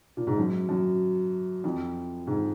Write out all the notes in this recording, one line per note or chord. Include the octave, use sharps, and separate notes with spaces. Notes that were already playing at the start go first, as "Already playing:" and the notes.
A#2
G#2
F#2
F#2
F2
G#2